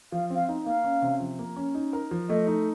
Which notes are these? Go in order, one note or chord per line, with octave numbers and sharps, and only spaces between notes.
F3 F5
C4 F5
D#4
A#3 F5
C#4
C3
F3
A#3
C#4
D#4
A#4
F3
A3 D#5
D#4